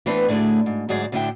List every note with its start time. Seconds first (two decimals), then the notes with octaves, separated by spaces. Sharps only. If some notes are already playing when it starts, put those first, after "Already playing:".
0.06 E3 A3 B3 C4 D4 B4
0.28 D2 A2 D3 A3 G#4
0.66 G#2
0.89 D2 G#2 F#3 G#4 D5
1.12 D2 A2 D3 E4 E5 G5